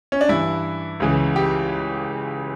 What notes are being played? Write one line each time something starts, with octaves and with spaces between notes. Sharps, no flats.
C#4
D4
G2 E3 E4
C#2 C#3 E3
G4